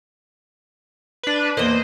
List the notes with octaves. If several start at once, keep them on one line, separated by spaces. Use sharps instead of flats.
D4 B4
E2 A#3 C5 D#5